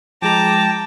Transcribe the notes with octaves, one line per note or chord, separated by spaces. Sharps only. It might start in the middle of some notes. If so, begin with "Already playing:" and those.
F3 G#3 G5 A5 A#5 D6